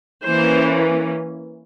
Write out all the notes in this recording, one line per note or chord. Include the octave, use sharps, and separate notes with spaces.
E3 A#3 C#4 C5